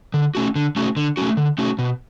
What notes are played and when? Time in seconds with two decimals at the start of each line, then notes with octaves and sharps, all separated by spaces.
0.14 D3
0.35 A3 C#4 F#4
0.56 D3
0.76 A3 C#4 F#4
0.96 D3
1.17 A3 C#4 F#4
1.37 D3
1.58 A3 C#4 F#4
1.79 B2